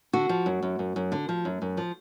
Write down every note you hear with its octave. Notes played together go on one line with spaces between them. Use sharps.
D3 F#4
F3
F#2
F#2
F#2
F#2
D3
F3
F#2
F#2
F3